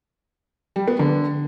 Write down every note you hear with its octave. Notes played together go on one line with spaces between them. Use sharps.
G3
B3
D3